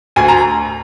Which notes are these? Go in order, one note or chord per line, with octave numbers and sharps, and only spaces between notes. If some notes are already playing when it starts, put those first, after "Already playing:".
D2 G#5
A#5